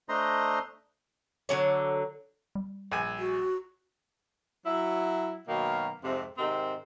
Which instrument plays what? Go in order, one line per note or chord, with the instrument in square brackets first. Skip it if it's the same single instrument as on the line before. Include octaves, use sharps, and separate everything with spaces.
[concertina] A3 D4 C5 D#5 A#5 C6
[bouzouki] D3 F#3 C#5
[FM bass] G3
[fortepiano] A#1 G#5
[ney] F#4
[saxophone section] F#3 E4
B2 D#3 F#3 A#3
F2 G#2 C3
G#2 C3 D#3 C4